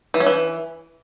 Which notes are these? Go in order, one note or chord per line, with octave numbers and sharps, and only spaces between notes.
E3
C#4
E3